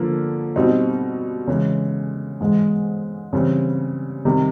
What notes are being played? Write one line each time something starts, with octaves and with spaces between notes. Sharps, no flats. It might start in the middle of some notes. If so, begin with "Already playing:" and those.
Already playing: D3 F3 A#3
B2 G3 C4 D#4
C#3 E3 G#3
G#2 E3 G#3
C#3 E3 G3 C4
C3 D#3 G3